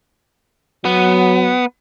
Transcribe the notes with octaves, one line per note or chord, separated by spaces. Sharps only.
F#3 B3